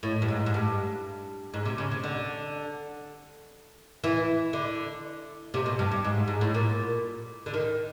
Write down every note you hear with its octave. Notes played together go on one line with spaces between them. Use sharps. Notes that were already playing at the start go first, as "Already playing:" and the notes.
A2
G2
G#2
G#2
G2
G#2
C3
C#3
C3
D3
E3
D3
C3
B2
G2
G2
G#2
G#2
A2
A#2
D3
D#3